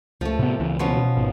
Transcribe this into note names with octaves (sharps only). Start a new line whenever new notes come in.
C#2 F3 A3
A2 C3 B3
C#2 E3
B2 F3 B3 C#4
G#1